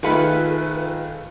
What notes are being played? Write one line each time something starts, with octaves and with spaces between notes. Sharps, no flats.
D#3 A3 F4 G#4 B4 B5 C#7